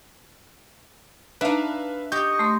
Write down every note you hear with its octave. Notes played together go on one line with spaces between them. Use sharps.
D4 D#4 B4 E5 F5 A5
G4 D#5 C#6 G6
A3 C6